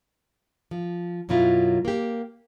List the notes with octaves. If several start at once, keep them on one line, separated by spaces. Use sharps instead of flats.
F3
F#2 B2 F#3 E4 F4
A#3 G4